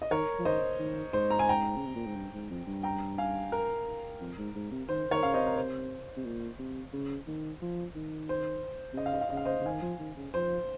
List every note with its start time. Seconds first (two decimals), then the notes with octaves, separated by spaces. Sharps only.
0.02 D#5
0.11 D#3 A#4 C#5
0.39 F3
0.45 D#3 C5 D#5
0.79 D#3
1.13 G#2 C5
1.30 A#5
1.39 G#5
1.49 G5 A#5
1.76 C#3
1.86 C3
1.96 A#2
2.06 G#2
2.15 G2
2.33 G#2
2.50 F2
2.67 G2
2.83 G5 A#5
3.18 F5 G#5
3.52 A#4
4.21 F2
4.38 G#2
4.55 G#2
4.71 C3
4.88 D#3 C5
5.11 D#3 A#4 C#5
5.23 C#3 F5
5.34 C3 C5 D#5
5.47 A#4
5.56 C5
6.17 C3
6.25 A#2
6.59 C3
6.93 C#3
7.27 D#3
7.62 F3
7.95 D#3
8.29 C5
8.93 C3
8.97 C#3 D#5
9.06 F5
9.13 D#5
9.21 F5
9.29 C#3 D#5
9.37 F5
9.45 C5 D#5
9.61 C#3
9.66 D#3 F5 G#5
9.82 F3
9.99 D#3
10.17 C#3
10.34 F3 C5